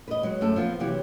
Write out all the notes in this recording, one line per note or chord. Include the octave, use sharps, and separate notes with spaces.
B4 D#5
F#3 G#3
F#2 A3 A4
F3 B3
C3 E3 F#3 G4